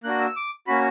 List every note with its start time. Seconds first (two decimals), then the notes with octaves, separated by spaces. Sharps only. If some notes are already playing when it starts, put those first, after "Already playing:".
0.04 A#3 D4 F#4 F#6
0.20 E6
0.36 D6
0.67 A#3 C#4 F#4 B5